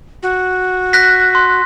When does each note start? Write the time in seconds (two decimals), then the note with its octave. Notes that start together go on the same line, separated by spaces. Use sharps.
0.23 F#4
0.93 F#6 A#6 B6
1.35 C6